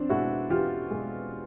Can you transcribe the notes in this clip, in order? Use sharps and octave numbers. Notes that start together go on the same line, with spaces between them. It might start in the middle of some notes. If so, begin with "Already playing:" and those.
Already playing: E2 C4 D4
B2 G#3 E4 F#4
E2 F4 G4
B2 G#3